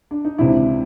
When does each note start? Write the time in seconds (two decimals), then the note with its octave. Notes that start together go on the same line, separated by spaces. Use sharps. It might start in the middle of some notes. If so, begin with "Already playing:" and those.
0.11 D4
0.25 D#4
0.38 C#2 C3 E3 D4 E4